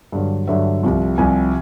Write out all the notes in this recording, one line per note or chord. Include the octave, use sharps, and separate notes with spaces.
G2 D3 F#3
G2 D3 F#3 E5
C2 C3 F3
C2 C3 F3 G#5